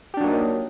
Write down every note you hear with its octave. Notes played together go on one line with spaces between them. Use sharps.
F#3 A#3 D4 D#4 G4